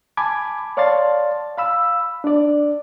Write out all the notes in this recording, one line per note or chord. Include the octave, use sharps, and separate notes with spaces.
G#5 A5 B5 D6 G#6
C#5 D5 F5 A5 C6 A6
F5 B5 E6
D4 D5